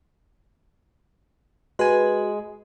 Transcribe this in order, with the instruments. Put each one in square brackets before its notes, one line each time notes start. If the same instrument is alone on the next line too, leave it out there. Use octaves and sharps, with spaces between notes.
[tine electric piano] G#3 G#5 [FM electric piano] F#4 B4